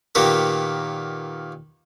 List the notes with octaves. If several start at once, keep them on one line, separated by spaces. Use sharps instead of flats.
A#2 D#3 B3 G4 A#4